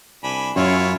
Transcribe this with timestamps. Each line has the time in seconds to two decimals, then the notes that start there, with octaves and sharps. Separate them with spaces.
0.24 C2 D4 G#5 B5
0.56 F#2 C#4 E4 F4 C#5